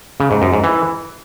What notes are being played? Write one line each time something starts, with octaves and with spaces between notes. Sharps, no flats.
C#3
G#2
F#2
G#2
E3